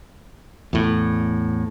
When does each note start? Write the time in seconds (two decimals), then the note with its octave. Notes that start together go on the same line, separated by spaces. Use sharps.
0.73 E2 A2